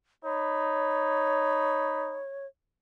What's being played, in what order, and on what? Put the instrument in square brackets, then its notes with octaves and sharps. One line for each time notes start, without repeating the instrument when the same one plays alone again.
[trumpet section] D#4 B5 [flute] C#5